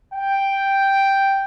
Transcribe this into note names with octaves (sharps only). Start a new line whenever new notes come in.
G5